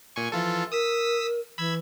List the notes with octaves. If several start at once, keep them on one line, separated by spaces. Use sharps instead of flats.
A#2 G#5 C#6
E3 F3 F4 A4
A#4 D#6 E6 B6
E3 B5 E6 G#6